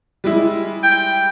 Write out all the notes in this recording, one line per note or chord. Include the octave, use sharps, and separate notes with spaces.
G3 G#3 E4
G5